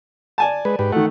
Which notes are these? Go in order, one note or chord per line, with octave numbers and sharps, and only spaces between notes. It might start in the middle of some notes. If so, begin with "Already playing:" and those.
D5 G#5 A5
G#3 B4
G#2 G4 B4
D#3 A3 F#5